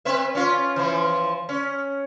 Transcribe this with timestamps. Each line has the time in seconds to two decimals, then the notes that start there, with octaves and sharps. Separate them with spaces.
0.05 C4 B4 E5
0.35 C#4 F4
0.76 E3 F3
1.49 C#4